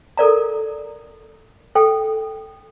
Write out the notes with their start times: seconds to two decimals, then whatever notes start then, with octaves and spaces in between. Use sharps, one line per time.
0.17 A4 A#4 D5 A#5
1.75 A4 G5